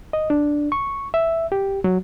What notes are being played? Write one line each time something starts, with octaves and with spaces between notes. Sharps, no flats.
D#5
D4
C#6
E5
G4
F#3